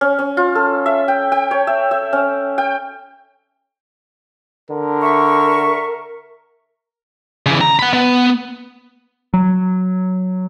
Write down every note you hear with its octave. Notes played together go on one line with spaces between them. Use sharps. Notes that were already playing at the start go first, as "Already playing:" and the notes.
C#4
C#4
F4
A4
E5
G5
G5
C#5
E5
E5
C#4
G5
D3 A#4
E5 C#6
C#3 E3
A#5
F#5 B5
B3
F#3